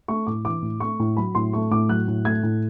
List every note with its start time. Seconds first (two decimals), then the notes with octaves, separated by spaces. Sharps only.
0.08 A3 C#6
0.27 A2 D6
0.45 E3 D6
0.62 A2
0.80 A3 C#6
0.99 A2
1.17 F#3 B5
1.35 A2 C6
1.53 A3 C#6
1.71 A2 D6
1.89 F#3 F#6
2.08 A2
2.25 A3 G#6
2.43 A2